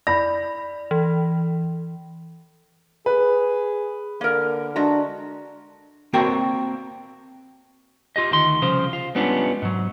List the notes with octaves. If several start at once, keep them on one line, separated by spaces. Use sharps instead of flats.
D5 B5 A#6
E3
G#4 B4
D3 A#3 A#4
G#3 D4 F#4 A#5
A#3 C4 F#4 A#4 F5 G5
F4 G4 D#5
D2 D#3 C6
C2 C#3 F3 F4 C5
F4
G3 G#3 B3 C#4 D4 F4
G#2 F#3